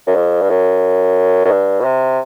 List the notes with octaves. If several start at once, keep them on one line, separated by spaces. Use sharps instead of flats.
F#2
F2
G2
F#2
F#2
G2
B2
C3